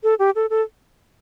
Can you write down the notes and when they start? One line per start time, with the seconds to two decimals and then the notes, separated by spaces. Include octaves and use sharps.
0.03 A4
0.19 G4
0.35 A4
0.50 A4